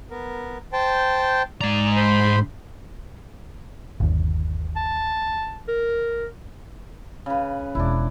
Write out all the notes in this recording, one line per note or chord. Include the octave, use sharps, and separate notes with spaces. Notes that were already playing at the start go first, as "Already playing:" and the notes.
B3 A#4
C5 G5 A5
G#2 D5 A#5
C5 B5 C6
G1 D#2
A5
A#4
C#3 B4
E1 D4 E4